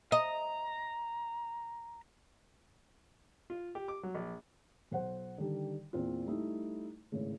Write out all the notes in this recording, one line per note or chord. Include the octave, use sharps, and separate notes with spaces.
D#5 A#5
F4
G4
D6
F#3
A#1
B1 C5 F#5
D3 D#3 G3
E2 A#2 C4 F4
G3 A3 D#4 E4
G#1 A2 C#3